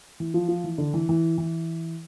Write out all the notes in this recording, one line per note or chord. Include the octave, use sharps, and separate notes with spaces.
E3
F3
F3
E3
D3
E3
E3
E3